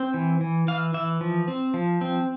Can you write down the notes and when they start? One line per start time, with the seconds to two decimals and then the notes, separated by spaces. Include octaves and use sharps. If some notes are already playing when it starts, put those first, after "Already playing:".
Already playing: C4
0.14 E3
0.41 E3
0.68 E3 F5
0.94 E3 E5
1.21 F3
1.48 C4
1.74 F3
2.01 C4